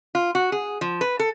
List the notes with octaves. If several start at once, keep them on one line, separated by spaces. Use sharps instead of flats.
F4
F#4
G#4
F3
B4
A4